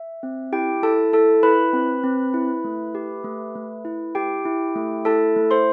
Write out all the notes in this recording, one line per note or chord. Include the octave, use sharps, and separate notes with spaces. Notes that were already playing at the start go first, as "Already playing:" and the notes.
Already playing: E5
C4
E4 G4 G5
E4 A4 A5
E4 A4 A5
E4 B4 B5
C4
C4
E4
A3
G4
A3
A3
E4
G4 G5
E4
A3
E4 A4 A5
A3
C5 C6